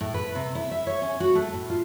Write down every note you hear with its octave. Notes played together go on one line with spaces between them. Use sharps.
A2
B4
C3
E4
E5
C#5
C#4
F#4
A3
A2
F4